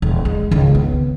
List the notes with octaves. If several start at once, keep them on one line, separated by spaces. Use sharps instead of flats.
D#1 E2
G#3
C#2 D#3
B3